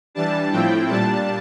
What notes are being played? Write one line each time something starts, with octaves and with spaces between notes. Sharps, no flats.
E3 G3 D4 A5
A2 F3 A3 C4 E4 G5
A#2 G3 D4 A5